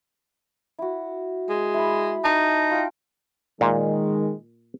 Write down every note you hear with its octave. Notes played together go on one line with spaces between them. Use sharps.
E4 F#4
G#3
E4 B5
D#4 A5
F4 G5
A#2 D#3 G#3